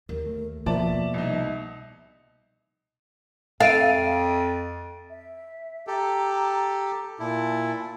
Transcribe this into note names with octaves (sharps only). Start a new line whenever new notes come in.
D#2 A#4
A3
B2 F3 A#3 D5 E5 A5
C2 D#4
F2 A4 E5 F5 A6 D7 D#7
E5
G4 A4 A#5
A#2 E4 A5